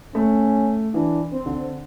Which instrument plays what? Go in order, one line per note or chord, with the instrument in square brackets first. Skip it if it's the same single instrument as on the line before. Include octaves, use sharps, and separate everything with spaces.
[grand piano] A3 [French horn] C#4
[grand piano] E3 [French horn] D4
[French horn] C4
[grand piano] D3